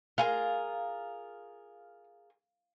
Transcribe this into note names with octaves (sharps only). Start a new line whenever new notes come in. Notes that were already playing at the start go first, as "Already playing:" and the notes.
F4 G#4 A#4 F5